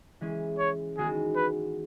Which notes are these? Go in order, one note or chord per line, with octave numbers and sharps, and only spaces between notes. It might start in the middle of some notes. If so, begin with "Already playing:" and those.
E3 G#3 C#4
C#5
D#3 G#3 B3 F#4 G#4
B4